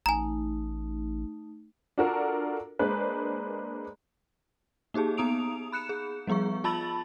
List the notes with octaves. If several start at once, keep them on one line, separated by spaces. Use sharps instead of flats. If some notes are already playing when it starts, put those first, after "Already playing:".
A1 A3 D#4 G#5 A#5
D4 F4 F#4 A4 A#4
G#3 A#3 D4 B4 C5
A#3 D#4 G4 G#4 A5
B3 D#4 A#5 D#6 D7 F7
B5 F#6 C#7 E7
G#4
F3 G3 B3 G#4 C#6
F4 A5 B5 E6 A6 F#7